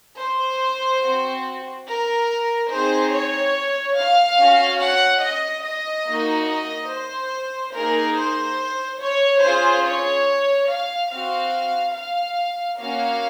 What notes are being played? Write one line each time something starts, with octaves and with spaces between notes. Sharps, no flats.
C5
C4 F#4
A#4
C4 D#4 G#4 C5
C#5
F5
C#4 F#4
F#5
D#5
D#5
A#3 D#4 F#4
D#5
C5
A#3 D#4 G#4 A#4
C5
C#5
C#4 F4 G#4 C5
C#5
F5
C4 F#4 F5
F5
A#3 C#4 F#4 F5